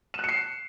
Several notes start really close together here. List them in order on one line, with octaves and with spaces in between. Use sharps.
E7 F#6 C#7 C7